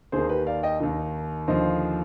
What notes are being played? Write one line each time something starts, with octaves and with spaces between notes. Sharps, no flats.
D#2 D#3 G#4 C5
G4 B4
D5 F5
D#5 G5
D#2 D#3
D#2 D3 F3 C5 D#5